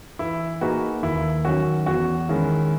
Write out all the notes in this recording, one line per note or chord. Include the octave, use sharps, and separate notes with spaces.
E3 E4
A#3 D#4 F#4 G#4 B4
D#2 E4
D#3 F#3 C#4 F#4
E2 F#4
D#3 G#3 C#4 E4